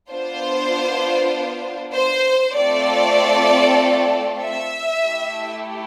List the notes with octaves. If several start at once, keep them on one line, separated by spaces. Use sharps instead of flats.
B3 D4 F4 C5
C5
A3 C4 F4 A4 D5
E5
A3 E4 G4